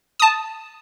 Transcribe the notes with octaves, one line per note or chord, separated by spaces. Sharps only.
A5 D#6